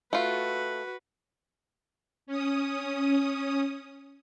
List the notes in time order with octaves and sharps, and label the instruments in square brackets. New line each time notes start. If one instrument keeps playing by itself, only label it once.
[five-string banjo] A3 F4 [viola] F#4 B4
[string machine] C#4 D#6